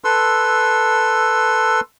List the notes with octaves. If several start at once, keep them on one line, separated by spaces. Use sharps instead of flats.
A4 B4 C6 E6